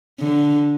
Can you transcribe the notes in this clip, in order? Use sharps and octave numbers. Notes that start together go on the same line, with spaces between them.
D3